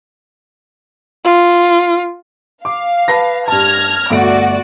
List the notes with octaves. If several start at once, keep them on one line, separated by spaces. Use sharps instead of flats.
F4
F5 D6
B4 A5 A#6
G2 A5 F6 G#6 A#6
G1 A3 F#4 D5 D7